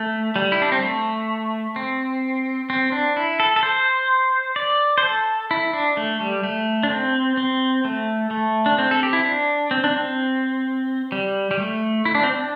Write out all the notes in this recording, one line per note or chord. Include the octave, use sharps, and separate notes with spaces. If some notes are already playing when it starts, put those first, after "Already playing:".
Already playing: A3
G3
E4
D4
C4
A3
C4
C4
D4
E4
A4
A4
C5
D5
C5
A4
E4
D4
A3
G3
A3
D4
C4
C4
A3
A3
D4
C4
A4
G4
E4
D4
C4
D4
C4
G3
G3
A3
E4
D4
C4
D4